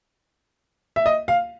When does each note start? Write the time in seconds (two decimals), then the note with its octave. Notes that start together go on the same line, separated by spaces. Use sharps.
0.96 E5
1.06 D#5
1.28 F5